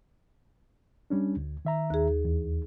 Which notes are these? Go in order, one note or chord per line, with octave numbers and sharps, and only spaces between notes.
G3 C#4 D4
D2
D#3 E5 A#5
D#2 G#4
E2